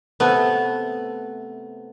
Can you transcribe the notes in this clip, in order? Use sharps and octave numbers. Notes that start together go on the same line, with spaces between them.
C3 A3 B3